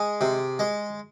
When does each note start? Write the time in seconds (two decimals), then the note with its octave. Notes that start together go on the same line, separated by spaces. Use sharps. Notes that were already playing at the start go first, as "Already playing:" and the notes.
Already playing: G#3 G#4 G#5
0.21 C3
0.59 G#3